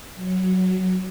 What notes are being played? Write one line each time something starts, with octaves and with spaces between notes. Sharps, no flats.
F#3